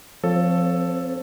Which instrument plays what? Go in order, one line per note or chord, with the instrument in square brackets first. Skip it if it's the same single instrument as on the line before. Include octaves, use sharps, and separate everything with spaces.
[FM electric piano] F3 [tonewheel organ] C4 [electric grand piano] A4 [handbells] C#5 F5